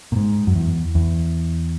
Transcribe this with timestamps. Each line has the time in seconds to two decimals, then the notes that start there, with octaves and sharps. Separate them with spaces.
0.12 A#2
0.16 G#2
0.47 F#2
0.55 E2
0.95 E2